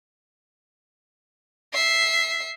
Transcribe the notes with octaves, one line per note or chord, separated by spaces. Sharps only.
E5 C7